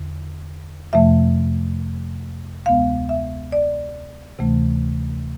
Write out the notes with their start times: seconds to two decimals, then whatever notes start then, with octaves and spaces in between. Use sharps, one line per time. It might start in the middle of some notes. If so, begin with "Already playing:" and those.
Already playing: E2 D3
0.93 F2 C3 F3 A3 E5
2.66 D2 C3 G#3 B3 F5
3.09 E5
3.52 D5
4.39 D2 C3 E3 A3